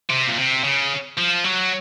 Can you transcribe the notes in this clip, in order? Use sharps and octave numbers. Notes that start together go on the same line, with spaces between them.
C3
A#2
C3
C#3
F3
F#3